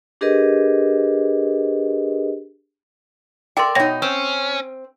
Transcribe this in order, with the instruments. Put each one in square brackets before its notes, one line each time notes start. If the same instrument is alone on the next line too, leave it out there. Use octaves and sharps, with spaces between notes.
[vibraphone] D4 G4 G#4 A#4 B4 D#5
[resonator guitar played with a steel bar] A4 A#4 D5 [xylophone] G5 C6
[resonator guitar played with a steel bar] B2 D#4 [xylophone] C#5 G5 A#6
[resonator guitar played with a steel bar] C4 [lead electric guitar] C#4